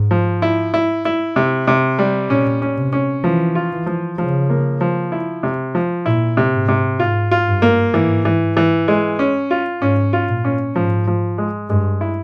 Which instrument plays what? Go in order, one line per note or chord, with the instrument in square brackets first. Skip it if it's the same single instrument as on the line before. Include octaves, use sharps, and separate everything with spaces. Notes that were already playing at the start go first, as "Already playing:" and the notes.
Already playing: [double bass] G#2
[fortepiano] F3
E4
E4
E4
C3
C3
G3
[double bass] A#2 [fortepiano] C#4
[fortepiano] C#4
[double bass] C3
[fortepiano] C#4
[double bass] E3 [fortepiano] F3
[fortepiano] F4
[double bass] E3
[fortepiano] F3
[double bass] C#3 [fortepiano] F3
[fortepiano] A#3
F3
E4
C3
F3
[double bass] A#2 [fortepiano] E4
[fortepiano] C3
[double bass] G#2
[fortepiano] C3
[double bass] G#2 [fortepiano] F4
[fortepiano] F4
[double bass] G2
[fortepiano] A#3
[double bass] G#2 [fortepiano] E3
[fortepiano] E3
E3
G#3
C#4
F4
[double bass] G#2 [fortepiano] C#4
[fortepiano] F4
[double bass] A#2
[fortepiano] C#4
[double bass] G#2 [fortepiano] F3
[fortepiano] F3
G#3
[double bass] G2 [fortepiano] G#3
[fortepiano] E4